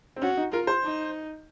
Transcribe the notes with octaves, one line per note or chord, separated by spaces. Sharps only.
C4
C#4 F#4
D#4
F4 A#4
C5
D#4